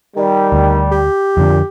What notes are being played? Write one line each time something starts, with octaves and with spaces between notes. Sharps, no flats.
D#3 G3
D2
G4
F2 A#2 D3